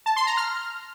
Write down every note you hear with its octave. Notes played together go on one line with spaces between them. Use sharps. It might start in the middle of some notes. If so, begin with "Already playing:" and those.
A5
C6
A#5
F6